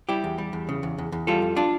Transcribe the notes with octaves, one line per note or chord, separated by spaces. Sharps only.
G3 E4 G4
E2
G3
E2
C#3
E2
E2
E2
G3 F4 A4
F2
D4 F4